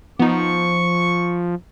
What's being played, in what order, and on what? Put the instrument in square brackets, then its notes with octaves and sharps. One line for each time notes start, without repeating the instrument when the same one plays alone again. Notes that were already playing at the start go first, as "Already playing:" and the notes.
[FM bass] F3 [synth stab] B3 D#4 [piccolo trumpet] C#6